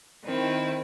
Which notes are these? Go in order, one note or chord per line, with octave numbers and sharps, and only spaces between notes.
D#3 C4 E4